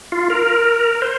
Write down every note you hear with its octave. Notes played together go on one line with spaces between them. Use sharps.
F4
A#4
C5